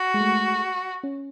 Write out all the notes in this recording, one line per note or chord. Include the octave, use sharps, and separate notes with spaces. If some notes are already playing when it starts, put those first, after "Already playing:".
Already playing: F#4
G#3
A3
C#4